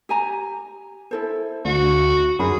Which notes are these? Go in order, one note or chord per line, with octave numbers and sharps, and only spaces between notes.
G4 G#5 A#5
E4 A4 C5
D2 F#4
F#2 D#4 F4 G#4 B5